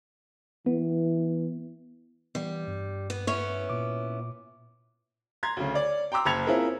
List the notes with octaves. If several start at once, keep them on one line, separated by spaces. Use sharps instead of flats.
E3 B3
E3 G3 B3
G2
B3
B3 C#4 E4 C#5
A#2 D6
A#5 C6 G#6
D2 C#3
C#5 D5
G5 A#5 C6 D6 E6
F#1 A5 B5 G#6 C#7 F7
C4 C#4 E4 F4 G#4 A#4